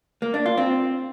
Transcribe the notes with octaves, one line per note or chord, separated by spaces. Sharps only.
A#3
D4
F4
C4